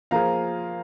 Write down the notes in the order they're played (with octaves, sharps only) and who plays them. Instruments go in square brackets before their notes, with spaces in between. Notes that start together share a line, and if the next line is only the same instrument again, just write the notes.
[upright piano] F3 A#3 F4 G#4 C5 [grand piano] F5 A#5